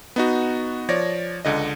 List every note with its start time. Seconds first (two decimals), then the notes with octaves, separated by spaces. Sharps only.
0.16 B3 D#4 F#4
0.89 F3 C#5 D5 A#6
1.45 C#2 D3 D#5